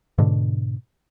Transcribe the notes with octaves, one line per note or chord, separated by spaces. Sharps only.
G#2 B2 D3